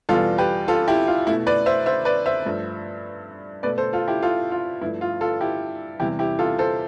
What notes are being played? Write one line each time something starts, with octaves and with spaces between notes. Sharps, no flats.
E2 B2 G3 F4 A4
G4 B4
F4 A4
E4 G4
F4
B2 A3 E4
B4 D5
C5 E5
C5 E5
B4 D5
C5 E5
G2 F3 A3
B2 A3 B4 D5
A4 C5
F4 A4
E4 G4
F4 A4
F4
G2 F3 A3 E4
F4
F4 A4
E4 G4
E2 C3 G3 E4 G4
E4 G4
F4 A4
A4 C5